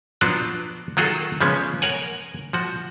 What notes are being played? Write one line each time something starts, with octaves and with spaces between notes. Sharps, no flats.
F3 F#3 B3 D4 F4 F#4
D#3 F#3 F4 F#4 G#4 A4
C#3 F3 G#3 B3 C#4
A#4 C#5 F#5 G#5
F3 F#4